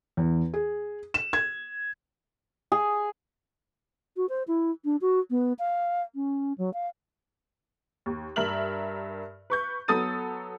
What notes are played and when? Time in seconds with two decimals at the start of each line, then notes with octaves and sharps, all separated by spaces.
0.17 E2
0.54 G#4
1.14 E7
1.33 G#6
2.72 G#4
4.17 F#4
4.29 C5
4.48 E4
4.85 D4
5.01 F#4
5.30 B3
5.59 F5
6.15 C#4
6.58 F#3
6.73 F5
8.06 D#2
8.36 G2 A#4 E5 F6 F#7
9.50 B4 C#6 G6
9.88 F#3 B3 A4 D#6 A6 D#7